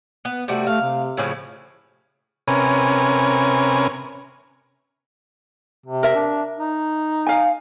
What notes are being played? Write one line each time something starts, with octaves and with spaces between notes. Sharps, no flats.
B3
C3 G3 A3 F#4
A3 F5
C3
A2 C#3 F3
C3 C#4 A#4 B4 G#5
C3
A#4 E5
D4
D#4
F5 G#5